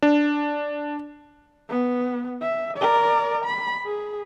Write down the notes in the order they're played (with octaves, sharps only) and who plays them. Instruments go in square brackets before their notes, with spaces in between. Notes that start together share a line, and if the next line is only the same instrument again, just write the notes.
[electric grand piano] D4
[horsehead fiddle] B3
E5
A#4 D5
B5
G#4